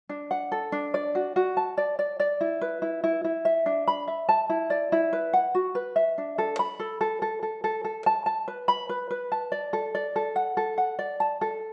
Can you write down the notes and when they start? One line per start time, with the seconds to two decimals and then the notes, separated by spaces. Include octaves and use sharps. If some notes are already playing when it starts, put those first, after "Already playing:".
0.09 D4
0.31 F#5
0.52 A4
0.72 D4
0.94 D5
1.15 F#4
1.36 F#4
1.57 A5
1.78 D5
1.99 D5
2.20 D5
2.41 E4
2.61 B4
2.82 E4
3.04 E4
3.24 E4
3.45 E5
3.66 D4
3.88 B5
4.08 E5
4.29 A5
4.49 E4
4.70 D5
4.92 E4
5.13 B4
5.33 F#5
5.55 F#4
5.75 B4
5.96 E5
6.18 D4
6.38 A4
6.59 B5
6.79 A4
7.01 A4
7.22 A4
7.43 A4
7.64 A4
7.85 A4
8.06 A5
8.26 A5
8.48 B4
8.68 B5
8.89 B4
9.11 B4
9.32 A5
9.52 D5
9.73 A4
9.95 D5
10.16 A4
10.36 F#5
10.57 A4
10.78 F#5
10.99 D5
11.20 A5
11.41 A4